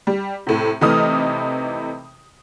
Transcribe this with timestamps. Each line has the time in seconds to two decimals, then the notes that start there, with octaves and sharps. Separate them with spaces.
0.07 G3
0.47 A2 C3
0.81 C3 E3 A3 D#4 D#6 F6